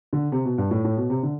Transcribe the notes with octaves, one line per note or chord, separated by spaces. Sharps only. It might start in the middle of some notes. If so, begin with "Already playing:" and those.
D3
C3
B2
G2
A2
A2
B2
C3
D3